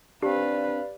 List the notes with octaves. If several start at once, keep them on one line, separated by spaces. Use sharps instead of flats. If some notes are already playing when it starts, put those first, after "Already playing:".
C4 D4 G4 B4 D5 F5